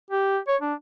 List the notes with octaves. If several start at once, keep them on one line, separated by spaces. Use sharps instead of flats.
G4
C#5
D4